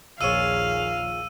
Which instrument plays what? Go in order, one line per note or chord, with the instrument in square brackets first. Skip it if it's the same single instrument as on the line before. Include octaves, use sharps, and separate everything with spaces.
[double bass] A#1 D#2 [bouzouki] F4 G#4 C#5 [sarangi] F5 [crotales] E6 D#7